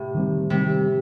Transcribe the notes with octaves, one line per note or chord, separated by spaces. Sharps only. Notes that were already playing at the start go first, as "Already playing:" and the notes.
Already playing: A2 C3
D#3 G3 C4
C3 D#3 G3 C4